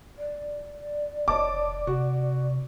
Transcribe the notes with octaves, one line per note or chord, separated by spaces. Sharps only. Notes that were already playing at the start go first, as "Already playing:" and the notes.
D5
F1 C#5 D#5 A5 D6
C3 F#4